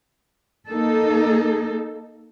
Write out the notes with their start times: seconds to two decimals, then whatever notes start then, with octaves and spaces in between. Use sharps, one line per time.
0.68 A#3 D#4 A4